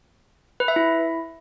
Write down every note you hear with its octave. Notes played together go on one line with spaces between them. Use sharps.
B4
E5
E4